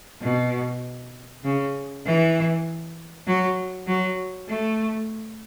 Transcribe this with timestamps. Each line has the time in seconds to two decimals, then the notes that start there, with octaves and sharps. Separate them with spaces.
0.21 B2
1.44 C#3
2.05 E3
3.26 F#3
3.87 F#3
4.48 A3